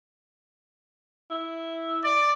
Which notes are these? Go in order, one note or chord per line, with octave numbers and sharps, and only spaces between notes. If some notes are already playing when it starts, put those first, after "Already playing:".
E4
D5